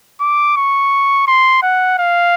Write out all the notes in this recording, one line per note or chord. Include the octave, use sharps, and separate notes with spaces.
D6
C#6
C6
F#5
F5